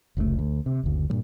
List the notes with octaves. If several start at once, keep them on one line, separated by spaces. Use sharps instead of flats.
F1 C#2 B2 A3
D2
C3
F#1 D2
G2 A#2 G3